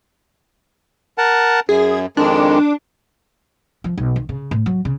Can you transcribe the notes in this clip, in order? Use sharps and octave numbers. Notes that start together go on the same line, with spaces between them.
A#4 F#5 A5
F#2 G#4
F2 D#3 G#3 D4
F3
B1
D#3
C#3
A2
F#3
C#3